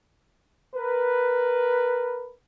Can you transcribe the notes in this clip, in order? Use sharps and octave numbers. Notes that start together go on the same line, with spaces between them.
A#4 B4